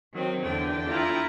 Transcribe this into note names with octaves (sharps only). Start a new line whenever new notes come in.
D#3 F#3 C4
E2 D3 D4 G5
E4 F4 A#5